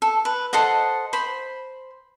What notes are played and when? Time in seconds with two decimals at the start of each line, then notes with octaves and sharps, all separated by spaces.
0.02 A4
0.25 B4
0.53 A4 C5 D#5 F#5
1.13 C5 B5